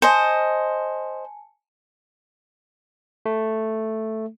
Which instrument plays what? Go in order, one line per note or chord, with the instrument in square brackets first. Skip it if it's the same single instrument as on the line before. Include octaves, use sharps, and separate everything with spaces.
[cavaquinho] C5 D#5 [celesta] G#5 A5 C#7
[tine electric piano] A3